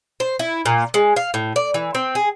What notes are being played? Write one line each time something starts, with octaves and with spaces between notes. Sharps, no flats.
C5
E4
A#2
G#3
F5
A2
D5
E3
C4
G#4